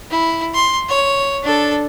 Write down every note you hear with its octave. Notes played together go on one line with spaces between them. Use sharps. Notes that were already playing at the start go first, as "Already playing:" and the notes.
E4
C6
C#5
D4 A4